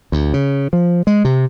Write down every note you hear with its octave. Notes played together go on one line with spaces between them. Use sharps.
D2
C#3
F3
G#3
C3